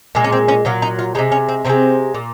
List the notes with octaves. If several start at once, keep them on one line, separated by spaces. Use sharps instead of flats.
A#2 G#3
C#4
C4
C#4
A#2 F#3 F4
D#4
F4
C3 D#3 G#3 D#4
C#4
C4
C3 D#3 G#3 C4
A#2